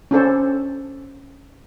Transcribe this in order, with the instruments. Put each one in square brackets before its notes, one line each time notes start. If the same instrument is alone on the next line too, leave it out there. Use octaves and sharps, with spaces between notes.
[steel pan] C#4 D4 A4 C5